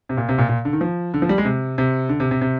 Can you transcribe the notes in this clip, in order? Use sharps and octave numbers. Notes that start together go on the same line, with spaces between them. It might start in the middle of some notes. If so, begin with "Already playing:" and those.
C3
A#2
C3
A#2
A#2
D3
D#3
F3
D3
F3
G3
G#3
C3
C3
D3
C3
C3
C3